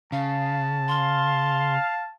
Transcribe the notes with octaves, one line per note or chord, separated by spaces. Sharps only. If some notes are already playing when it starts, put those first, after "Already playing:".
C#3 F5 A5
F5 C6